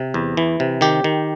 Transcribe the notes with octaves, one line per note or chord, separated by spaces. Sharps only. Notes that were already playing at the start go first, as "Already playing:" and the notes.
Already playing: C3
E2
E3
C3
D#3 G4
D#3